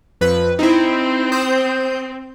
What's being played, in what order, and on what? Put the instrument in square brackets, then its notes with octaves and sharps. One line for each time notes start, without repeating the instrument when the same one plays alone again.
[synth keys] F2 B4
[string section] C4 [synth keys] D#4 E4
[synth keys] C5 D#6 G6